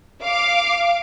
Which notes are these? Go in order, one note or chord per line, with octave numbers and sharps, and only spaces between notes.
F5 D6